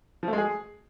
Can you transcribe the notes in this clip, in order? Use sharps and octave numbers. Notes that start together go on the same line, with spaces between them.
F3
A3
G#3
G#4